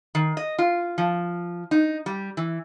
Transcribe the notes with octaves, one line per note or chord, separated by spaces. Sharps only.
D#3
D#5
F4
F3
D#4
G3
E3